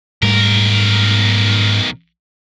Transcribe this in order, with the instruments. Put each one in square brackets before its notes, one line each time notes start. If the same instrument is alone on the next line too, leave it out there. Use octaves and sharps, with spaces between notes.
[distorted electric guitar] B1 A#4 [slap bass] G#2 G3 A3